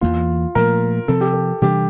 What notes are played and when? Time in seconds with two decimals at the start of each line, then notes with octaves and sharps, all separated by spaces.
0.01 E2 E3 A#3 F4
0.55 A#2 F3 A3 A#4
1.08 C3 F3 C4 A4
1.21 G4
1.33 A4
1.62 C3 E3 G3 D4 G4